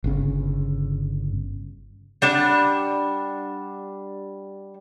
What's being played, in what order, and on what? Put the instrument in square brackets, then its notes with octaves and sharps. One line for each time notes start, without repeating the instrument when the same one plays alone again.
[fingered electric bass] G1 C#3
[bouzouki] G3 D4 F#5